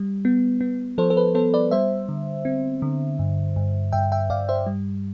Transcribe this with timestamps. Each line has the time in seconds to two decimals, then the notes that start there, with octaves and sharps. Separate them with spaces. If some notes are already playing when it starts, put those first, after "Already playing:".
Already playing: G3
0.25 B3
0.61 B3
0.98 F3 A4 C5
1.10 A4
1.17 B4
1.35 B3 A4 C5
1.54 B4 D5
1.71 G3 C5 E5
2.09 D3
2.45 C4
2.82 D3
3.19 G2
3.56 G2
3.92 G2 E5 G5
4.12 E5 G5
4.30 G2 D5 F5
4.49 C5 E5
4.66 G3